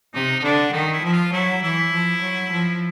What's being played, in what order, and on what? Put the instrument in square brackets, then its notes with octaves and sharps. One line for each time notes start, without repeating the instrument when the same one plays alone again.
[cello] C3 [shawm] D#4
[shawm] D#4
[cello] D3 [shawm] D4
[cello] D#3 [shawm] D#4
[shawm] E4
[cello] F3 [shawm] E4
[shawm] F4
[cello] F#3 [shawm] E4
[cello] E3 [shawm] E4
[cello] F3
F#3
F3